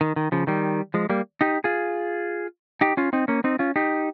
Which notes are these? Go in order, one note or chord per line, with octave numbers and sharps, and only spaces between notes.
D#3
D#3
C#3 F3
D#3 G3
F3 G#3
G3 A#3
D#4 G4
F4 G#4
D#4 G4
C#4 F4
C4 D#4
A#3 C#4
C4 D#4
C#4 F4
D#4 G4